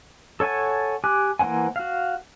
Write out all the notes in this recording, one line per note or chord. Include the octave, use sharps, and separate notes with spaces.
A4 C#5 F#5 G#5 A5
G4 G#5 D6 F#6
E3 A#3 C5 F#5 G#5
F#4 F5